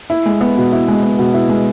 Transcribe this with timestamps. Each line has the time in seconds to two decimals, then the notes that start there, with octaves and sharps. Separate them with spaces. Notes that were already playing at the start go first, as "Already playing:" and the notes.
0.10 E4
0.26 G#3
0.41 B3
0.57 B2
0.72 E4
0.88 G#3
1.03 B3
1.19 B2
1.34 E4
1.49 G#3